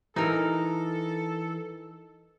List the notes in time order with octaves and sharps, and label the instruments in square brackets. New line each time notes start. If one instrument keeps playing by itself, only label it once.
[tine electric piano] E3 [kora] D#4 A#4 [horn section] A4